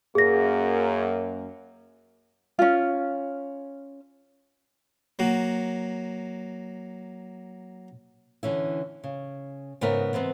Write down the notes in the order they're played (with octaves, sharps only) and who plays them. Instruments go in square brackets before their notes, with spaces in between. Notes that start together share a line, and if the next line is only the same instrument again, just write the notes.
[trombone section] F#2 A#3 [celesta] G#4 A#6
[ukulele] C#4 F4
[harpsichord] F#3 A#3 F#4
[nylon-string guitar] D3 E3 C#4 E4
C#3
G#2 C#3 B3 D#4 A#4 E5
G#2 E3 B3 C4